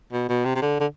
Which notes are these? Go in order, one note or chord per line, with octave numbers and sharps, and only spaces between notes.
B2
B2
C3
C3
D3
D3